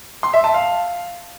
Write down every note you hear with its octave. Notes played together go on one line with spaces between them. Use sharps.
C6
E5
A5
F5